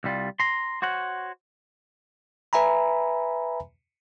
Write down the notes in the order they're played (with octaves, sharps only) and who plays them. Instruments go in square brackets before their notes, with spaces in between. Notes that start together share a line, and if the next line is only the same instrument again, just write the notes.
[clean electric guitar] C2 G3 F4
A#5 C6
F#4 C5 C#5 F#5
[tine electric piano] B4 E5 G#5 A#5 B5